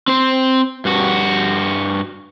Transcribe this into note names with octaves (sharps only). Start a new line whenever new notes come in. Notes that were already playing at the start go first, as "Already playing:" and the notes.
C4 C5
G2 F#4